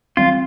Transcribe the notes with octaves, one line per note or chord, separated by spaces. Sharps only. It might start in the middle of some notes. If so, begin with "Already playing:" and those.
E3 G3 C4 F4